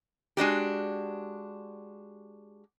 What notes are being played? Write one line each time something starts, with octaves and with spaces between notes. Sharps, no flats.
G#3 D4 F#4 G4